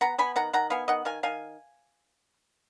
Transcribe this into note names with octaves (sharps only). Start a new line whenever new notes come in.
B3 F#5 A#5
B3 G#5 B5
D#3 F#5 A#5
D#3 F#5 A#5
B3 F5 G#5
D#3 D#5 F#5
D#3 F5 G#5
D#3 F5 G#5